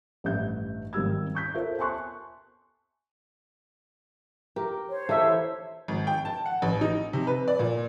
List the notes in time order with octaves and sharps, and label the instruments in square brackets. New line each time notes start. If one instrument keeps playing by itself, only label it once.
[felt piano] A1 G2 E5 G6
G#1 D#3 G3 G4 E6 G#6
C#6 G6 B6
F4 A4 A#4 C5 C#5 E5
E5 G#5 A5 C6 C#6 F#6
[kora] G4 [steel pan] A#4
[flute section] C5 C#5
[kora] E3 A#3 G4 [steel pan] A4 E5
[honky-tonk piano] G#1
G5
A5
F#5
A1
D#4
C3
B4
D5
A#2